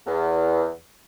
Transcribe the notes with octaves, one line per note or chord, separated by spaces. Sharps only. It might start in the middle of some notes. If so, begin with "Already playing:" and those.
E2